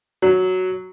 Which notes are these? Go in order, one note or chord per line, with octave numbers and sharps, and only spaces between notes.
F#3